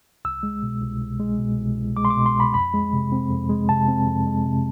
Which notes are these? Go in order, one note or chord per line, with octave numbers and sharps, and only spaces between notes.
C2 E6
G#3
B2
C2
C2
G#3
B2
C2
C2
G#3 D6
C6
D6
B2
C6
C2
B5
F2 B5
G#3
C3
C4
F2
G#3
C3 A5
C4
F2
G#3
C3